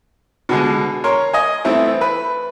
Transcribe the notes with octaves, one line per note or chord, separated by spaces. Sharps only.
B2 D3 G#3
A#4 C#5 C6
D#5 G#5
E3 A3 B3 C4 E4
B4